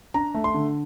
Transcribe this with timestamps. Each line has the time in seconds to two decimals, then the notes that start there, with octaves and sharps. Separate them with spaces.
0.14 D4 A#5
0.34 A3
0.44 C6
0.54 D3